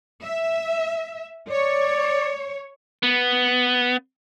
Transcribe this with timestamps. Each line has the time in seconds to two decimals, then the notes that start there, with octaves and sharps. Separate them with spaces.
0.21 E5
1.50 C#5 D5
3.03 B3